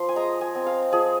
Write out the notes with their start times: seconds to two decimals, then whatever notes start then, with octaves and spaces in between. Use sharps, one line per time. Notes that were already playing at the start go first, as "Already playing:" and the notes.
Already playing: F3 C6
0.09 G#5
0.16 G#3 A#5
0.41 G#5
0.55 C4
0.66 F5
0.92 F3 G#4